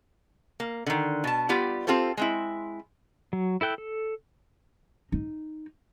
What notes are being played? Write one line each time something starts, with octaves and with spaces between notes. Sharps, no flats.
A#3
D3 D#3
B2 A5
G3 B3 F4 G4 D5
C4 F4 G4 A4 C5
G#3 C4 E4
F#3
E4 A4 G5 F#6
A4
D#4